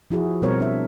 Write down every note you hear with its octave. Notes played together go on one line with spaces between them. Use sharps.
F3 E4 F#4 G#4
B2 G3 C4 A#4 C5 C#5
D4 E5